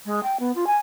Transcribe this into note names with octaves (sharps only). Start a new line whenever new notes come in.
G#3
G5
B3
F4
G#5